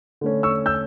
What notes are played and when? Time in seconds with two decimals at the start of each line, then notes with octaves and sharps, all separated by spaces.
0.21 D3 A3 C#4
0.43 C#6 E6
0.66 E6 G6